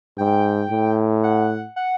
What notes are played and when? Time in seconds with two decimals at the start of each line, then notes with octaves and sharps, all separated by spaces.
0.18 G#2 G5
0.70 A2
1.23 F#5
1.76 F#5